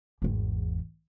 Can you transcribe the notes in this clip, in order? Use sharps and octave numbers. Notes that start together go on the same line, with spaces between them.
G#1 E2